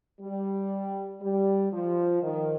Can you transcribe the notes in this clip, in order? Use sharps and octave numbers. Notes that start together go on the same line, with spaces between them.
G3
G3
F3
D#3